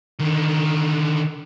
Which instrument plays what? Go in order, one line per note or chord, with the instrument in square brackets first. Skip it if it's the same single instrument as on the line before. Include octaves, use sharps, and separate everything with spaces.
[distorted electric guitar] D3 D#3